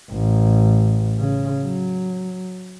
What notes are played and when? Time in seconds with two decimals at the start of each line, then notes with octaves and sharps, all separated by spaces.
0.12 A1
1.18 C#3
1.62 F#3